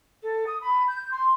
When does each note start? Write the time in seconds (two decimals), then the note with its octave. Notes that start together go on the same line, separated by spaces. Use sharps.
0.22 A4
0.46 D#6
0.61 B5
0.87 G6
1.10 C6